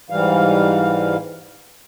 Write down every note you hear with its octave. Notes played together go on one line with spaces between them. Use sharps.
G#2 E3 G3 F5